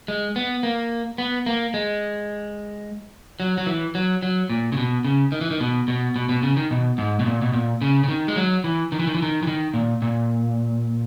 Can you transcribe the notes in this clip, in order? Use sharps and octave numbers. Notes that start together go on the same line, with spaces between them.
G#3
B3
A#3
B3
A#3
G#3
F#3
F#3
E3
F#3
F#3
A#2
C#3
B2
C#3
D#3
E3
D#3
B2
B2
B2
B2
C#3
D#3
B2
G#2
B2
A#2
B2
A#2
C#3
C#3
D#3
G#3
F#3
E3
D#3
E3
D#3
E3
D#3
E3
D#3
A#2
A#2